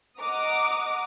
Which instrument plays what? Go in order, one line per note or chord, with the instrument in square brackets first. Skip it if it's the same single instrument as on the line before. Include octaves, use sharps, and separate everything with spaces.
[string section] D#5 F#5 A#5 D6 D#6